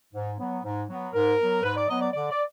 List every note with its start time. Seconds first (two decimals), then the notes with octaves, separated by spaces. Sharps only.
0.14 G#2
0.40 F#3 B3
0.64 G#2
0.89 F#3 B3
1.13 G#2 A#4
1.38 F#3 B3
1.63 G#2 B4
1.76 D5
1.88 F#3 B3 D#5
2.01 D5
2.13 D3 D5
2.30 D5